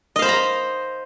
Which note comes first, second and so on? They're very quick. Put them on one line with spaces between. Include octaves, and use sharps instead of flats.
D#5 F5 C5 B5 A#5